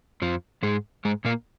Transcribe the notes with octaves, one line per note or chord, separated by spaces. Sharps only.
F2 F3
G#2 G#3
G#2 G#3
A#2 A#3